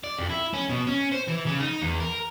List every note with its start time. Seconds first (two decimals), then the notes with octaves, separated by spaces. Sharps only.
0.04 D5
0.18 F2
0.30 E4
0.54 C#4
0.69 B2
0.87 C#4
1.12 C5
1.28 E3
1.45 C#3
1.60 D#4
1.81 E2
2.00 A#4